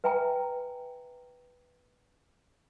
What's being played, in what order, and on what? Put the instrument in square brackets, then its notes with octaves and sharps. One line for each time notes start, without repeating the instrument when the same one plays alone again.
[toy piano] B4 E5 G5 G#5 A#5